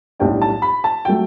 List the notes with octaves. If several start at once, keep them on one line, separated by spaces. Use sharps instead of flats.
B1 A2 G3 D4 G5
A5
B5
A5
F#3 A3 G5